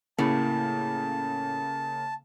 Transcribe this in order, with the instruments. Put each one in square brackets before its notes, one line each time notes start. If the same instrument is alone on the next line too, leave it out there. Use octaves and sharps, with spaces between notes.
[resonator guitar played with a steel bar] A2 [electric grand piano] C#3 A#3 [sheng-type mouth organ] A5